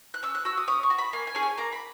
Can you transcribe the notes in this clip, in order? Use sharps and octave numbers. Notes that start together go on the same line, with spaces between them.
F#6
C#4 E6
F#6
F#4 E6
D#6
C#4 D#6
C#6
F#4
B5
A#3 G#5
G#5
C#4 G#4
G#5
A#3 A#5
B5